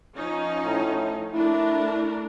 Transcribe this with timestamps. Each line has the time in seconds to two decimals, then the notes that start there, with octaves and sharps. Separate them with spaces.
0.16 F3 C#4 D#4
0.66 A2
1.34 A3 D4 E4 A#4